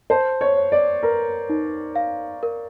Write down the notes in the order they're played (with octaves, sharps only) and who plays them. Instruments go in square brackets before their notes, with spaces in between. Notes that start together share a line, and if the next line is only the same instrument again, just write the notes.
[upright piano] C5 [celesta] A5
[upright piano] C#5
[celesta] C#5
[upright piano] D5
[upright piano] A#4 [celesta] B4
[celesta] D#4
F5
A#4